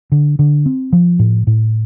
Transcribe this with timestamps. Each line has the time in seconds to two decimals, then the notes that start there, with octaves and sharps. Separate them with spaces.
0.12 D3
0.39 D3
0.66 C4
0.93 F3
1.19 A2
1.47 A2